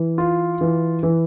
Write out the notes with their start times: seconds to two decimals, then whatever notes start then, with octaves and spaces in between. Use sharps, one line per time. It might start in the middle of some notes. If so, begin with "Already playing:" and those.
Already playing: E3
0.18 F4
0.61 E3
1.03 E3